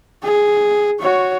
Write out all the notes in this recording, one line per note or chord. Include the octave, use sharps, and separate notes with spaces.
G#4
F#4 C#5